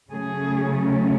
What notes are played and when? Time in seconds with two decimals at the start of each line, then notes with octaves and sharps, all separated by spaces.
0.11 C#3 F#3 A3 C#4 G#4